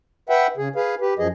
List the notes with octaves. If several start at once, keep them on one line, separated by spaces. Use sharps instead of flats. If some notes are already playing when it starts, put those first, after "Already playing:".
B4 E5 F#5 G5
C#3 G#4
G#4 B4 F5
G4 B4
F#2 F3 G#4 D#5